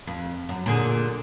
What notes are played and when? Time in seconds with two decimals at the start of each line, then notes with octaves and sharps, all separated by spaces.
0.07 F2
0.49 F#2
0.66 A#2 D3 G#4